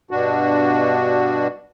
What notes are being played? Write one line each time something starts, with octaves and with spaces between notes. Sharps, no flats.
G2 B2 D4 F#4